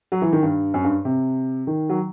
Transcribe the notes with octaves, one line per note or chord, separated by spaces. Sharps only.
F#3
E3
D#3
G2
F#2
G2
C3
D#3
F#3